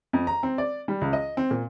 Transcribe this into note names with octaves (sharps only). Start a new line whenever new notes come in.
F2
A#5
C4
D5
G3
C#2
D#5
C4
A#2